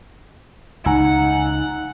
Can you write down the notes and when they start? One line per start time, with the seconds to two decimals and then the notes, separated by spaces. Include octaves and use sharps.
0.86 C#2 D#4 F#5 G#5 A#5 E6